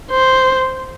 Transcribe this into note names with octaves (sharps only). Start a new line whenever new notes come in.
C5